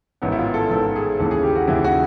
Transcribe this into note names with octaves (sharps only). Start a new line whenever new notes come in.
A1 G#2 D#3 B3
E4
F4
A4
A1 G#2 D#3 A4
G#4
D#2 C#3 E3 A4
G#4
G4
F#4
D#2 C#3 E3 E4
F#4